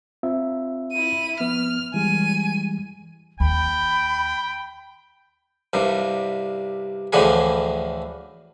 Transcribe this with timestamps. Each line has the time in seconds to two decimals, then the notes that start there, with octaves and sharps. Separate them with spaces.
0.23 C4 F4 E5
0.92 E4 D#7
1.40 F3 B3 F6
1.94 E3 G3 G#3 G#5 D#7
3.40 D#2 G5 B5
5.73 C2 G2 C3
7.13 D2 A2 D3 E3 F3 G#4